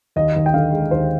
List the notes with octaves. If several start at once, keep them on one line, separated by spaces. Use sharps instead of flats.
D#2 D#5
D#2
G5
D3 F5
G#3
D#2 C5